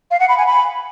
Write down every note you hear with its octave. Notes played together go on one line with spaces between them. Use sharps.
F5
F#5
B5
G#5
B5